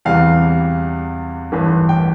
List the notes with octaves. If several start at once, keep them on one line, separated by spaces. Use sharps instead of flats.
E2 C3 E3 G3 F5
A1 G2 E3
G5